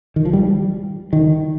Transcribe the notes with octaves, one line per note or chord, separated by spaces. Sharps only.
D#3
F3
G3
D#3